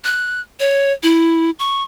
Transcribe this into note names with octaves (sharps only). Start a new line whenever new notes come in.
F#6
C#5
E4
C#6